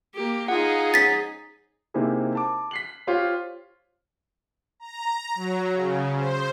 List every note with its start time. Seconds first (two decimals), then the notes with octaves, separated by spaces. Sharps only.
0.14 A#3 G4
0.48 D#4 F4 G#4 F#5
0.94 G#2 F3 C#4 A6 B6
1.94 C3 A#3 C4 D#4 E4 G#4
2.35 A5 D6
2.71 B6 C7 F#7
3.07 F4 G4 C5 C#5
4.80 A#5
5.35 F#3
5.71 C#3
6.15 C5